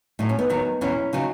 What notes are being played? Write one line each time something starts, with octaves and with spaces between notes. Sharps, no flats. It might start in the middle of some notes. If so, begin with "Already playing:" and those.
A2 F#3 D#4
C#4
B3 D#4
D#2 D#3 F#3
E2 B2 F#3 C#4 E4
C#3 F#3 D#4 F#4